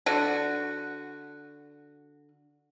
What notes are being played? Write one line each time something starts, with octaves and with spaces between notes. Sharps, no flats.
D3 F#4